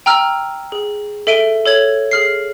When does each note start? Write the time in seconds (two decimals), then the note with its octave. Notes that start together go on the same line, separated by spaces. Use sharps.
0.06 G5 A#5 E6 F6
0.72 G#4
1.27 A4 E5 D7 D#7 G7
1.65 A4 C#5 G#6 F#7
2.11 G#4 F6 C7